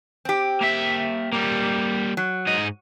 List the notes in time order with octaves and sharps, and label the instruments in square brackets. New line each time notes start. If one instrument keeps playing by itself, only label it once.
[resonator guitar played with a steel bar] C4 G4
[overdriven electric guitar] A#3 E5
G3 A#3
[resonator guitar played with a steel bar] F#3
[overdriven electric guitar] G#2 D#5